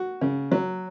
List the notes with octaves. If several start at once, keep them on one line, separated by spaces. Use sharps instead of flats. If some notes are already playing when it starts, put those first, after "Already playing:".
Already playing: F#4
C#3
F#3